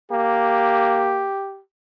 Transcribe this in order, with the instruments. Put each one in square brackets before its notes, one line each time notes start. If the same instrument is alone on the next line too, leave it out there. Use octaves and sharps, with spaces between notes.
[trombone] A#3 [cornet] G4